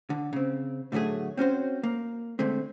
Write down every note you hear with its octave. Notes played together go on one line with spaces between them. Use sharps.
D3
C#3 C4
A2 D3 F#3 A3 G#4
C4 C#4 F#4 C5
A#3
D3 G#3 A3 C4